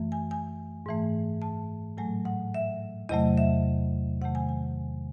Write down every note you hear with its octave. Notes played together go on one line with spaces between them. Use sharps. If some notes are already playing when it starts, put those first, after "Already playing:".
Already playing: F#2 E3 A3
G#5
G#5
G#2 E3 A3
A5
A2 F#3 A3 G#5
F#5
E5
E2 C3 F#3 A3 D#5
E5
C3 D#3 A3 F#5
G#5
G#5